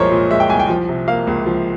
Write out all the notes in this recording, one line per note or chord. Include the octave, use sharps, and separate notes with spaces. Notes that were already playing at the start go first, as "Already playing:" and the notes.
Already playing: C2 A#2 F3 G#3 A#4 C5 C#5
A#2
G#3 E5
G5
C2 G#5
G5
F3
C3
A#3 F5
C#2
F3